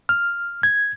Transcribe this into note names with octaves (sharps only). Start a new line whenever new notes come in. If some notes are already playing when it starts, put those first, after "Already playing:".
F6
G#6